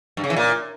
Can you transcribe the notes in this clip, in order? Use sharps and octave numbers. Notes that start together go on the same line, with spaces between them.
G2
C#3
E3
A#2